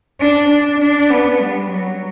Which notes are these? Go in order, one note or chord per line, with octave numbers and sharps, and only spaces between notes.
D4
D4
D4
B3
G3
F#3